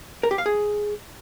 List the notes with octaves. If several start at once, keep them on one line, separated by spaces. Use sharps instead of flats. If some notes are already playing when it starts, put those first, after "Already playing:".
A#4
G4
F5
G#4